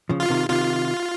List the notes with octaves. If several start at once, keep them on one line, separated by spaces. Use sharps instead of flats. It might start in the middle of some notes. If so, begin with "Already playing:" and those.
C#3 F3
F4
C3 D#3
C3 D#3 F4